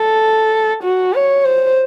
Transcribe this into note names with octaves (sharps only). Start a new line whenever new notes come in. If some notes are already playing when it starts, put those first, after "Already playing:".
Already playing: A4
F#4
C#5
C5